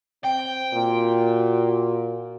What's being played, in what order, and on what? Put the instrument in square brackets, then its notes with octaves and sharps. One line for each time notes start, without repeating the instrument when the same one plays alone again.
[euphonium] C4 [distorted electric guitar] G5
[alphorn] A#2 [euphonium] F#4